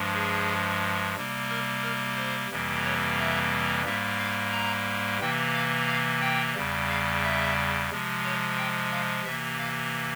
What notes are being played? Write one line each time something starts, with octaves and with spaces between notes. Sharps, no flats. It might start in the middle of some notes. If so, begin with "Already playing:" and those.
Already playing: G2 F3 G#3
G#4
C3 G3 A#3
A#4
A#4
C5
F2 C3 E3 G3 A#3
C#5
E5
G#2 G3 A#3 E5
F5
A#5
C3 E3 A#3 G5
F5
F5
G5
E2 C#3 G3
F5
E5
C3 F3 G#3
C#5
G5
F5
C3 E3 A#3 E5
F5